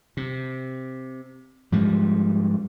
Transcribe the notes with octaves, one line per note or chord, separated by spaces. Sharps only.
C3
G#2 F3 G3 G#3